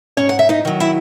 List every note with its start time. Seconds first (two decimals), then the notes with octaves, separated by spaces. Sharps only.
0.17 G#2 C#4 C#5
0.29 F#5
0.39 E5
0.49 D#4 D#5
0.65 D#3 F#3
0.80 E4 E5